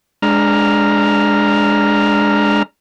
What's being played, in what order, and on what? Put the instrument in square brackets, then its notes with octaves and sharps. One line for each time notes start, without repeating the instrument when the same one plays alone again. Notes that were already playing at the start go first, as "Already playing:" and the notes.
[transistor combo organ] G#3 D4 A#5 F6